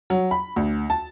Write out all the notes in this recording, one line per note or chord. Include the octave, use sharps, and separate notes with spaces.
F#3
B5
D2
A5